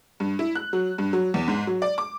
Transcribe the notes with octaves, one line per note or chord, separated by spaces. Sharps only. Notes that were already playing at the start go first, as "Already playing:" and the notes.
G2
E4
F#6
F#3
G2
F#3
E2
G#2
F#3
D5
D6